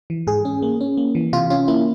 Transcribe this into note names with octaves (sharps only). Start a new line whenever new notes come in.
E3
G#2 G#4
C#4
A#3
C#4
A#3
E3
C3 F4
C#4 F4
A#3 E4